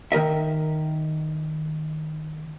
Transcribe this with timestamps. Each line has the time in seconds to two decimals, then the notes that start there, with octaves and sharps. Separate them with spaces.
0.12 D#3 A#4 D#5 E5